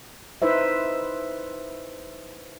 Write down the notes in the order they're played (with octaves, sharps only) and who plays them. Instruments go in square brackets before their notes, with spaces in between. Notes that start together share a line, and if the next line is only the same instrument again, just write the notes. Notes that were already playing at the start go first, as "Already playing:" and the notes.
[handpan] D#4 E4 B4 C5 E5